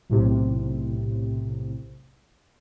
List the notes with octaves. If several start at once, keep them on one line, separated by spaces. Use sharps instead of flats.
B1 A2 C3